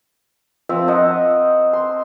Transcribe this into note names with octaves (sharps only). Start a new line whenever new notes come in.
F3 C4 F4 E5
A#4 C5 D#5 F#5
C6